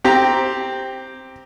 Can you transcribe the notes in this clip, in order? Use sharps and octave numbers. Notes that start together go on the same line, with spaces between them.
C4 G4 A#5